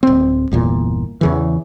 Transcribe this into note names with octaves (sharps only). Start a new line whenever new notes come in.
D1 C4
G1 E2 A#2
E2 C#3 E3